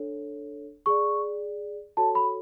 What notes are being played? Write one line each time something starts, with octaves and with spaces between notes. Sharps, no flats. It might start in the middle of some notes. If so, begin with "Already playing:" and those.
Already playing: D4 A4 C#5
G#4 D5 C#6
F#4 A4 C#5 A5
B5